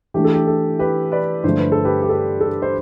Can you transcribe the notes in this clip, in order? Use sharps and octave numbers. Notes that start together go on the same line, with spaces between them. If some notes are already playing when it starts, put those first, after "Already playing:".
E3 A3 D4 G4
A4
G4
A4
G4 B4
B4 D5
G2 D3 F3 A3 C5
B4
A4
G4 B4
G4
A4
A4
C5